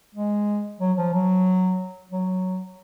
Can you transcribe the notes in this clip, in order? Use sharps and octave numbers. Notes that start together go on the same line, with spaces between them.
G#3
F#3
F3
F#3
F#3